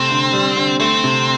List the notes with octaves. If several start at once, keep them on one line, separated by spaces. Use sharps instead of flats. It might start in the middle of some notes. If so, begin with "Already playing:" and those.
Already playing: C3 A3 C4
D3
G3
D3
A3 C4
C3